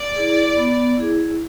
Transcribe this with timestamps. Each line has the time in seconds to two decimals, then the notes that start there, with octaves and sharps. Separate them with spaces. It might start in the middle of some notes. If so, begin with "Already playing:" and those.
Already playing: D5
0.16 E4 G#4
0.57 B3
0.97 E4 G#4